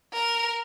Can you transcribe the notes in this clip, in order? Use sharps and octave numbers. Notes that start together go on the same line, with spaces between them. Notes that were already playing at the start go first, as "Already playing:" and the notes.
A#4